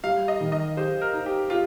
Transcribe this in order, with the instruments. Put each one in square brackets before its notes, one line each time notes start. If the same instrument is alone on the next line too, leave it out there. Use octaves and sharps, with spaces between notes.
[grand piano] G3 [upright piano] F5
[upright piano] D#5
[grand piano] D#3
[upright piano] D#5
[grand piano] G4 [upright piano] C5
[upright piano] A#4
[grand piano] D#4
[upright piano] G4
[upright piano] F4 [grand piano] G4